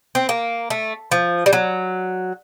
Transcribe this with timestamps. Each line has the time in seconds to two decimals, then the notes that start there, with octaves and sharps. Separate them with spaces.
0.15 C4
0.29 A#3
0.70 A3
1.11 F3
1.46 G3
1.53 F#3